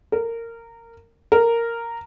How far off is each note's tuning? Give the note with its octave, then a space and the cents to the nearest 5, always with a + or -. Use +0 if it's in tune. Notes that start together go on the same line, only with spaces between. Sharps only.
A#4 -15
A#4 -5